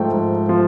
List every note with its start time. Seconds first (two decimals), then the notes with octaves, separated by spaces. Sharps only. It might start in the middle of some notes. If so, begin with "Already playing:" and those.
Already playing: G#2 F3 A3 G5
0.12 G#2
0.49 F3